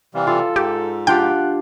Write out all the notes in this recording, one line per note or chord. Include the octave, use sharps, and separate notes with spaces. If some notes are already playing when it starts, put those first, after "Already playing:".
C3 E3 G3 F5
F4 A4
G#2 G4
D4 F4 G4 F#5 G5